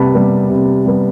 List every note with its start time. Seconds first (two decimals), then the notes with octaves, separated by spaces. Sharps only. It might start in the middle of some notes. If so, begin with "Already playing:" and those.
Already playing: C3 G3 B3 B4 A5 B5
0.15 G3 B3
0.50 C3
0.86 G3 B3